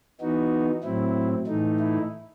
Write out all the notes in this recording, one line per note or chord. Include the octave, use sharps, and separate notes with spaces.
E3 B3 D#4 F#4
A2 F#3 C4 E4
A2 E3 A3 D#4
E4